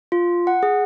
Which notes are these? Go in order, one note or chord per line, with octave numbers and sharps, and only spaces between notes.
F4
F#5
G#4